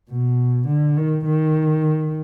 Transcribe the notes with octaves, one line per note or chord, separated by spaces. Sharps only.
B2
D3
D#3
D#3